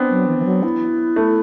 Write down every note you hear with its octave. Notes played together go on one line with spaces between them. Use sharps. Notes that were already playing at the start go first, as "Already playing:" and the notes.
Already playing: B3 C4 D4
F#3
E3
E3
F#3
E4
A3